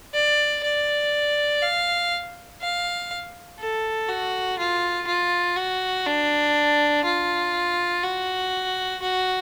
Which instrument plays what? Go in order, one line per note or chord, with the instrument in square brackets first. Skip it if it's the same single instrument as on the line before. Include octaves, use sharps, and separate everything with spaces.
[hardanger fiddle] D5
D5
F5
F5
A4
F#4
F4
F4
F#4
D4
F4
F#4
F#4